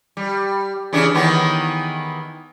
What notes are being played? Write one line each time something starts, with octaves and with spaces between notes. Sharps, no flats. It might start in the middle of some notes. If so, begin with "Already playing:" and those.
G3
C#3 E3 D4
D#3 E3 B3